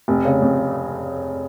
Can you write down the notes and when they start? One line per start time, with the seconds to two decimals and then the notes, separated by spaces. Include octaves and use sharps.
0.08 F1
0.25 C#3
0.42 F2